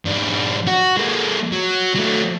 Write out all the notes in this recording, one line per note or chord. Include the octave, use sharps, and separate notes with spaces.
G#2 D4
F#4
G#3 A#3
F#3
F#3 A3